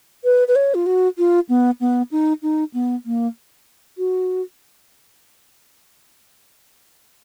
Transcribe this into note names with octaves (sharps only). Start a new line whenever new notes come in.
B4
B4
C#5
F4
F#4
F4
B3
B3
D#4
D#4
B3
A#3
F#4